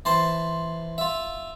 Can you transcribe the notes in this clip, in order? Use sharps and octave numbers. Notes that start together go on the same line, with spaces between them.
E3 C5 A5 C6
F4 E5